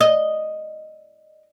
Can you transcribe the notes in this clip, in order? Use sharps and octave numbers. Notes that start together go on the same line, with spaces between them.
D#5